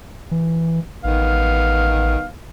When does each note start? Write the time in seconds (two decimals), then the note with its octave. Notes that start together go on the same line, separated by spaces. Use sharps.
0.31 E3
1.04 A1 D#3 B3 F5